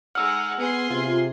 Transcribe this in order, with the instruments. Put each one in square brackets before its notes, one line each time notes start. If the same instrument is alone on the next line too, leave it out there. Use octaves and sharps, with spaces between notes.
[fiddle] G#3 D#4 [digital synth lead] F#5 [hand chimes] E6 F6
[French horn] B3 [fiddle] G#4 C6
[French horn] C3 [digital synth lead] F4